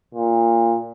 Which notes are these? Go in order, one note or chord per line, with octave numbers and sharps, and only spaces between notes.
A#2